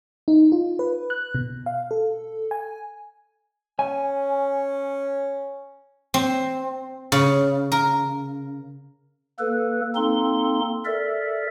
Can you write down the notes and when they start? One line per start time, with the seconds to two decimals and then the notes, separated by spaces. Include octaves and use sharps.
0.28 D#4
0.52 F4
0.79 B4
1.10 F#6
1.35 B2
1.66 F5
1.91 A4
2.51 G#5
3.79 C#4 G#5
6.14 C4
7.12 C#3
7.72 A#4
9.39 A#3 A4 B4
9.95 A#3 C4 D#4 A4 C6
10.85 A4 A#4 D5 E5